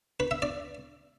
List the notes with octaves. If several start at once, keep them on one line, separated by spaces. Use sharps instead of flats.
B4
E5
D5